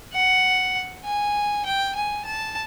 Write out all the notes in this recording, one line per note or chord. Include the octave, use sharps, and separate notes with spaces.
F#5
G#5
G5
G#5
A5